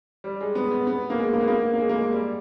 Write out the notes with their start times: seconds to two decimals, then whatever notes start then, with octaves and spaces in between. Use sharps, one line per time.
0.24 G3
0.41 G#3
0.55 B3
0.71 B3
0.87 B3
1.10 A#3
1.18 G#3
1.33 A#3
1.41 B3
1.48 A#3
1.73 A#3
1.80 G#3
1.89 A#3
1.96 G#3
2.12 G3